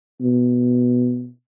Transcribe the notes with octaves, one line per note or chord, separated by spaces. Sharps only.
B2